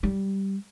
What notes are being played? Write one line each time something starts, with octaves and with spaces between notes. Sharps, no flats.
G3